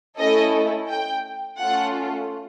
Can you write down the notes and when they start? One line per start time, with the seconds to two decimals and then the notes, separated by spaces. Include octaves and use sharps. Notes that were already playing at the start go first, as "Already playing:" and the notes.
0.17 A3 C#4 E4 A4 D#5
0.89 G5
1.60 A3 C#4 F4 A4 F#5